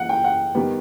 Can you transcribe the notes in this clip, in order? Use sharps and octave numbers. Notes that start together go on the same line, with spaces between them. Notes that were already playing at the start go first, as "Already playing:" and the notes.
Already playing: G#2 E3 A#3 F#5
G5
F#5
D#3 G3 B3